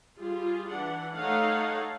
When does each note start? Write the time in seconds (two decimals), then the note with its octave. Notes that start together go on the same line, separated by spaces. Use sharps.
0.18 G3 F4 G#4
0.70 E3 D4 F#5
1.14 A3 D#4 A4 C#5 F5 F#5